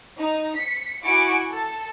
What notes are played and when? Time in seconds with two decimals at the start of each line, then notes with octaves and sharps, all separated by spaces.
0.18 D#4
0.59 B6 C#7
1.05 E4 F#4 G#5 D6 C#7 D7
1.51 A4